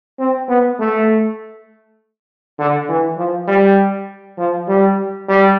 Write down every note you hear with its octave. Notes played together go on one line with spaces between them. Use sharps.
C4
B3
A3
D3
E3
F3
G3
F3
G3
G3